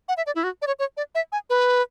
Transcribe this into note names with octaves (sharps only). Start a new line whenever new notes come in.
F#5
E5
D5
E4
F#4
D5
C#5
C#5
D5
E5
G#5
B4